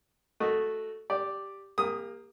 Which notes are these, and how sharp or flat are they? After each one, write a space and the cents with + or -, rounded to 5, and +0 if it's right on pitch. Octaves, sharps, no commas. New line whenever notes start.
A3 +0 F#4 +0 D#5 +0
G4 +0 D5 +0
A#3 +0 G4 +35 D#6 +0